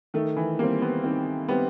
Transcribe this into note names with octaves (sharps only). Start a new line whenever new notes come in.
D#3 A3
E3
G3 A#3 C4
B3
D#3 C4
G3 B3 C4